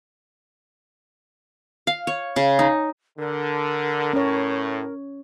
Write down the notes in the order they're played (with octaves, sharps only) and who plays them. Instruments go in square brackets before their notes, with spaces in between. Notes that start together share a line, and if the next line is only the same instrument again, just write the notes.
[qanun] F5
C#5
C#3
D#4
[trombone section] D3 [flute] A#4
[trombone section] A2 [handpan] C#4 C#5